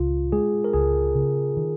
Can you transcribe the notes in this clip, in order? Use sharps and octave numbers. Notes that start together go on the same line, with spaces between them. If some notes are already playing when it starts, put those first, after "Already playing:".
Already playing: C#2 F4
G#3 G#4
A#4
C#2 G#4
C#3
D#3